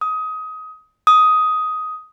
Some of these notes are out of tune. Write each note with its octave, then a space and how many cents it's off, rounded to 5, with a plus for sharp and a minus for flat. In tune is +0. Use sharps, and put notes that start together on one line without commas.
D#6 +20
D#6 +10